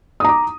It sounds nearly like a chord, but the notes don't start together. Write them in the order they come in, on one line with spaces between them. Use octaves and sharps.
D#6 A#5 D6